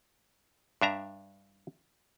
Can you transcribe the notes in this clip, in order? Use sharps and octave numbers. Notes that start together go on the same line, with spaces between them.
G2 D4 E5 A#5